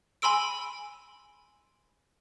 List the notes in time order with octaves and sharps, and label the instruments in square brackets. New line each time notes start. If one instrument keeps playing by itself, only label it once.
[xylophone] G#5 B5 C6 E6 D7